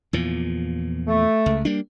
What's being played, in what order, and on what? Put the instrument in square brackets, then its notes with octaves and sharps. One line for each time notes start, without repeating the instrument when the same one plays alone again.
[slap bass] E2 A#2 F3
[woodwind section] A3
[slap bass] C#2
G3 A#3 D4